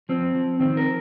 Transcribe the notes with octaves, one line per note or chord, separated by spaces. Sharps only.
F3 C4
F3
D#3 C4
A#4